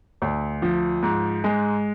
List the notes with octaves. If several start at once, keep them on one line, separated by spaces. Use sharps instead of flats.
D2
F3
G#2
G#3